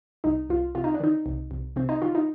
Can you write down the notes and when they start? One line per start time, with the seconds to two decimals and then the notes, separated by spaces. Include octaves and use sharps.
0.24 C2 D#4
0.49 C2 F4
0.75 C3 F4
0.84 D#4
0.94 D4
1.00 D#3 D#4
1.26 C2
1.51 C2
1.76 C3 C4
1.89 D#4
2.02 D#3 F4
2.15 D#4